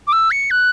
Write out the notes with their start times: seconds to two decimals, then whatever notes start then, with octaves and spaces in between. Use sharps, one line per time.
0.07 D6
0.13 E6
0.31 C#7
0.51 F#6